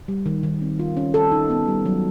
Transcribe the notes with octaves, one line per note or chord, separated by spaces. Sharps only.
G3
D#3
D#3
C4
F4
C#4
A4
D#4
B3
G3
F#3